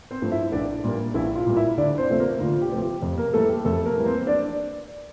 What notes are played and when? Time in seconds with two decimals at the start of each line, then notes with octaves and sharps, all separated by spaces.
0.11 C4 C5
0.22 G2 F3 A3
0.32 E4 E5
0.52 A#1 D4 D5
0.84 A#2 G3 A#3
1.14 A#1 E4 E5
1.35 F4 F5
1.46 A#2 G3 A#3
1.56 E4 E5
1.77 D2 D4 D5
1.98 C4 C5
2.09 C3 F3 A3
2.20 A#3 A#4
2.40 D2 F4
2.61 G4
2.71 C3 F3 A3
2.82 G4
3.02 F2
3.18 A#3 A#4
3.33 E3 G3 A3 A#3 A4
3.49 G4
3.65 F2 A3 A4
3.85 A#3 A#4
3.96 E3 G3 A#3
4.06 C4 C5
4.27 D4 D5